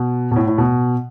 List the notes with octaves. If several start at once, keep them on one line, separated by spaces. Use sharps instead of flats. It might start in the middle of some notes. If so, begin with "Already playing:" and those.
Already playing: B2
B2
A2
A2
B2